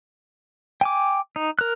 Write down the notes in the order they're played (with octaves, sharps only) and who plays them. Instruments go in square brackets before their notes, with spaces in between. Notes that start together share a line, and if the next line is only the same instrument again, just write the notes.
[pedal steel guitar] G5 G#5 D6
D#4
A#4 F#6